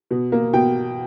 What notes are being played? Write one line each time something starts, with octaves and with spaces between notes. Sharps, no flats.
B2
A#3
B2 G5